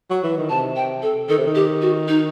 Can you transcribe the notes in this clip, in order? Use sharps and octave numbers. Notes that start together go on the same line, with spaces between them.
F#3
E3
D#3
C3 A5
G5
A4
D#3 A4
C3
D#3
G4
F#4
D#4